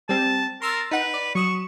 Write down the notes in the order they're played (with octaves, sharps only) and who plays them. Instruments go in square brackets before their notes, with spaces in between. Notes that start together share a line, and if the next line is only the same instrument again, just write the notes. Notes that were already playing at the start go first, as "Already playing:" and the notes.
[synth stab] G3 C4 [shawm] A5
[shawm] A#4 [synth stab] C6 E6 A6
[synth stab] D#4 F#5 [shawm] B4
[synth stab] D5
[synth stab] F#3 D#6 E7 [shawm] C#6